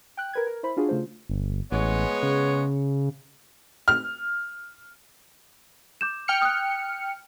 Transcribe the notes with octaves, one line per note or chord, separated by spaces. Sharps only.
G5 F#6
A#4 B4 G#6
A#4
E4 C5 B5
D4 F4 F#4 G#4
C#3 A3 F4 C5
G1
A1 G#3 B3 C#5
C#3
F6
D6 G6 E7
G5 F6 C#7
D#6 F#6